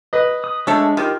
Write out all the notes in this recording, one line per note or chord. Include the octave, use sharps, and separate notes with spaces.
B4 D#5
D#6
G#3 A3 D4 A4 C#5
D#3 F4 G4 A#4